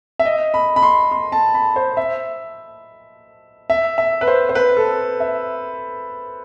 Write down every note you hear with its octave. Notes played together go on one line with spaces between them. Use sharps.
E5
D#5
B5
B5
C6
C6
A5
B5
C5
E5
E5
E5
B4
C5
C5
B4
A4
E5